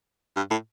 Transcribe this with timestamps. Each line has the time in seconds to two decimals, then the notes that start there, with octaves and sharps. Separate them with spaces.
0.37 G2
0.51 A2